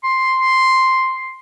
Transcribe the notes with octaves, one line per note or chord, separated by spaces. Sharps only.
C6